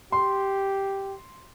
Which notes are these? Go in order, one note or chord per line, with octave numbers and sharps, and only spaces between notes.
G4 C6